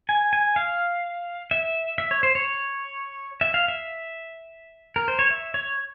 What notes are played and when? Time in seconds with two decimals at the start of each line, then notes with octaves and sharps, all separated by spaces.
0.09 G#5
0.33 G#5
0.56 F5
1.51 E5
1.98 E5
2.11 C#5
2.23 C5
2.35 C#5
3.41 E5
3.54 F5
3.68 E5
4.96 A#4
5.08 C5
5.19 C#5
5.30 E5
5.54 C#5